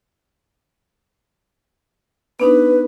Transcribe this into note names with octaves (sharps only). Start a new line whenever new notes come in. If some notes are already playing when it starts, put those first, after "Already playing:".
B3 D4 D#4 B4